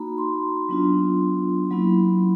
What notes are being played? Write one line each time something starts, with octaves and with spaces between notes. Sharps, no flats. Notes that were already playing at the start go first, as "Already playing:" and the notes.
Already playing: A#3 D#4 F#4 A#5 B5
C6
F#3 B3 D4 F4
F#3 A#3 C#4 E4 B5